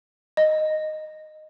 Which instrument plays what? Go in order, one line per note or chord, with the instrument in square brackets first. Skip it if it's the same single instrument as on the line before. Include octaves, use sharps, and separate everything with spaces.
[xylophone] D#5